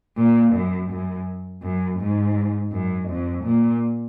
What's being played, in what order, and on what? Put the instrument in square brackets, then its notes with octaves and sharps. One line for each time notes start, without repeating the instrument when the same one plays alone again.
[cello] A#2
F#2
F#2
F#2
G#2
F#2
F2
A#2